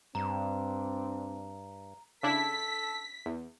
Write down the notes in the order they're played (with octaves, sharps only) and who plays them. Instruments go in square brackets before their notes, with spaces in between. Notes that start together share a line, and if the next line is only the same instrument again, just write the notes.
[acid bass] G2 [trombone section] C4 D4 [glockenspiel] A#5
[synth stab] C#3 D4 E4 [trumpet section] A4 [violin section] B6
[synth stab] E2